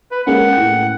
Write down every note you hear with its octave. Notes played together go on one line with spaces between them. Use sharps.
B4
G#3 A#3 C#4 F#5
A2 G5